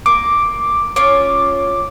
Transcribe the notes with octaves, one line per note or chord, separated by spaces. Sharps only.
A#3 D6
C#4 F4 C#5 D6